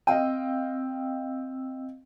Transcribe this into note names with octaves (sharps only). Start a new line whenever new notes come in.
C4 D#5 F5 G5 E6